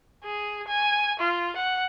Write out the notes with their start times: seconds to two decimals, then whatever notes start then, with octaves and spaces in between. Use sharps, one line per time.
0.24 G#4
0.68 G#5
1.20 F4
1.56 F#5